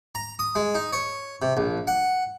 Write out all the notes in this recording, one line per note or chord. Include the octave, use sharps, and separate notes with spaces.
A#5
D#6
G#3
D#4
C#5
C3
A#1
F#5